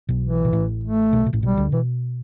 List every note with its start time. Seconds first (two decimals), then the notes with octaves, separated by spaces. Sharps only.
0.09 B1 B2
0.23 E3
0.45 B2
0.53 A1 A2
0.84 A3
1.13 B1 B2
1.26 B2
1.33 A1 A2
1.43 B1 B2 G3
1.57 D2 D3
1.72 B2 E3